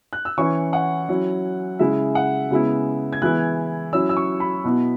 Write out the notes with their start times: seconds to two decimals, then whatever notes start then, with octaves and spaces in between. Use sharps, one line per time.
0.13 F#6
0.25 E6
0.38 E3 C#4 E4 C#6
0.73 F#5
1.09 F#3 C#4 E4
1.79 C#3 G#3 E4 E5
2.15 F#5
2.51 C#3 G#3 B3 E4
3.13 G#6
3.22 E3 G#3 B3 E4 F#6
3.93 F#3 C#4 E4 E6
4.09 E6
4.17 C#6
4.40 B5
4.64 B2 B3 E4